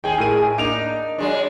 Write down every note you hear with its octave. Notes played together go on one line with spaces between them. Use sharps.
D#2 G#4 G5 G#5
A2 A#4 D#7
A#3 D4 D#4 D7 F7
F#3 G#3 D4 D5